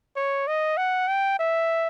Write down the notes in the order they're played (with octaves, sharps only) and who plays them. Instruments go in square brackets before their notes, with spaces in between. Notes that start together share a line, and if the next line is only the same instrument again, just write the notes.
[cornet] C#5
D#5
F#5
G5
E5